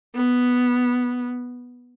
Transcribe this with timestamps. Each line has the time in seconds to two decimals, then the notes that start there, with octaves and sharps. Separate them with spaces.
0.15 B3